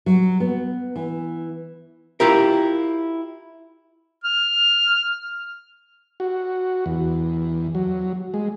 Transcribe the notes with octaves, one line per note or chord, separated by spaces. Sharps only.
F#3
B3
E3
E4 F4 G4 A#4
F6
F#4
E2
F#3
G#3